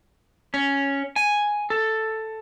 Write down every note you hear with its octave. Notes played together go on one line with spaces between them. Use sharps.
C#4
G#5
A4